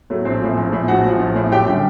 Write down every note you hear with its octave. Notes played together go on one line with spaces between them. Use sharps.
A2 F#3 A3
A#1 C4 C5
A2 F3
A#1
A2 F3
A#1 F#4 F#5
A2 F3
A#1
A2 F3
F#2 G4 G5
D3 G3